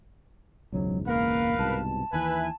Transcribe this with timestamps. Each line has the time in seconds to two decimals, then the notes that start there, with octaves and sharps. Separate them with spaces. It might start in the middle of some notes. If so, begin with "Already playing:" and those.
0.73 E1 C#2 G#2 F#3
1.08 A#3 A#4 B4 F5
1.59 C2 G#2 B2 A5
2.13 D#2 D#3 E3 B4 E5 G#5